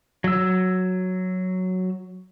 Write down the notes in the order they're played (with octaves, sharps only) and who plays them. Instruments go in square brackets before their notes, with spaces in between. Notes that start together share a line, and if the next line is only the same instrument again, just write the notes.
[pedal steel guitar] F#3 E6